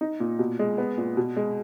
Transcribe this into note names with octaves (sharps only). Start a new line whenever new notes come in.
D#4
A#2
B2
G#3
B3
A#2
B2
G#3